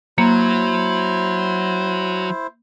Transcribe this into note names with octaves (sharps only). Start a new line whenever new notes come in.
F#3 A#3 E4 C5